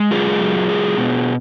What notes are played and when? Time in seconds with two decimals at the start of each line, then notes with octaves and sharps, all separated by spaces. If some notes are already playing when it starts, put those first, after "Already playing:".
Already playing: G#3
0.11 F#2 F4 G#4
0.40 F#3
0.69 G#3
0.97 B2